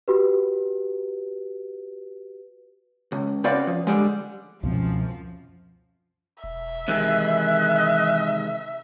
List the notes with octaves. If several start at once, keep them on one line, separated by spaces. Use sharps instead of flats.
F#4 G4 B4
C#2
C4 C#4 F#4 B4 D5 F5
F3
D3 G3 G#3
C#2 F#2 B2 F3 C4
E1 E5
C3 D#3 E3 G#3 F#6